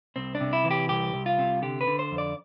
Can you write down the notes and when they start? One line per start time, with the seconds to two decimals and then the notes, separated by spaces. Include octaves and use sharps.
0.16 C2 C4
0.35 D4
0.41 C3
0.53 E4
0.64 E3
0.71 G4
0.89 C2 G4
1.14 C2
1.26 F4
1.39 C3
1.62 D3 G4
1.81 B4
1.87 D3
1.99 C5
2.11 F2
2.18 D5